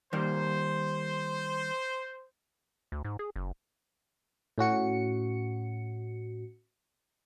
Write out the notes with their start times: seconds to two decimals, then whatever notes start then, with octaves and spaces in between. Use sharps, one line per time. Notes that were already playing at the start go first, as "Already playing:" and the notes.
0.13 D#3 G3 A#3 C5
2.92 D2
3.05 G#2
3.19 G#4
3.36 F#1
4.58 A2 C#4 F#4 C#7